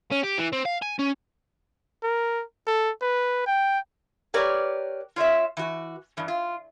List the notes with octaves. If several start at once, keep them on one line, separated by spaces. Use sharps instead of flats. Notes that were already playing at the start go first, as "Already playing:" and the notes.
C#4
G4
E3
C4
F5
G#5
C#4
A#4
A4
B4
G5
G4 A#4 B4 C#5 D5
F4 C#5 D#5 E5
E3 F#4
G2 E3
F4